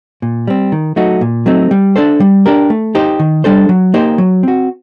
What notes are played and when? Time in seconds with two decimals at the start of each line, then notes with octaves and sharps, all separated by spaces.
0.22 A#2
0.47 G3 C4
0.72 D#3
0.96 F#3 A3 D#4 F#4
1.21 A#2
1.46 F#3 A3 C4 D#4
1.71 G3
1.96 D4 A4 C5
2.20 G3
2.46 D4 G4 A#4
2.70 A3
2.95 D#4 G4 C5
3.19 D#3
3.44 G3 D4 A4 C5
3.69 F#3
3.94 A#3 D#4 G4 C5
4.18 F#3
4.43 C4 F#4